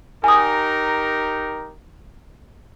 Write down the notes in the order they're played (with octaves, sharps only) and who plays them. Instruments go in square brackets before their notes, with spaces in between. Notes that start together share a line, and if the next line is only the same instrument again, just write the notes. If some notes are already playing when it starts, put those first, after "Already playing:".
[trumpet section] D#4 G4 A#4 [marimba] G#5 D#6